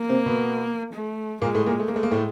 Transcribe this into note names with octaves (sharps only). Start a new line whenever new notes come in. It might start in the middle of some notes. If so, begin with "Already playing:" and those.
Already playing: A#3
C3 C4
B2 B3
A3
A#2 G#3 A#3
A2 A3
A#2 A#3
A3
A#3
G#3 A3
A#3
A2 A3